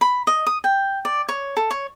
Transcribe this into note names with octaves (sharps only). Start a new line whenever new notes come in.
B5
D#5
D#6
G5
D5
C#5
A4
C#5